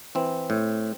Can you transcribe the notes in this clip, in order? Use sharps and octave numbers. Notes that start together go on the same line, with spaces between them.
E3 C4
A2